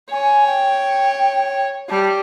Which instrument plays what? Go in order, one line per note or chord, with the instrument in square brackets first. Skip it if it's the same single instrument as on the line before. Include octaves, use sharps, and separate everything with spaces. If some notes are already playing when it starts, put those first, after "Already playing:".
[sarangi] C#5 [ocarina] G#5
[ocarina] G5
[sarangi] G3 [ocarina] A5